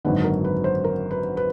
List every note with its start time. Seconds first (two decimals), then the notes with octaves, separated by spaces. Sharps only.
0.05 G#1 F#2 D3 B4
0.24 A#4
0.44 B4
0.64 C5
0.84 A#4
1.11 B4
1.37 B4